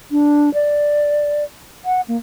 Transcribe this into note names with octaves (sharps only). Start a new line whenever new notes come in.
D4
D5
F#5
A#3